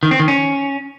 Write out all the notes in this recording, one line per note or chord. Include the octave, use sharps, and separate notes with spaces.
D#3
C4
D#3
C#4